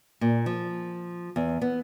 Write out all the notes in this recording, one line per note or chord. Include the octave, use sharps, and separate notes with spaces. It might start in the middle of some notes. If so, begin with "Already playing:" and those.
A#2
F3
E2
B3